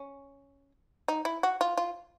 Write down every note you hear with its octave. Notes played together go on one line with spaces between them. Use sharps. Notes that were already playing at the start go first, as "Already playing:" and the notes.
Already playing: C#4
D#4
E4
F#4
F4
F4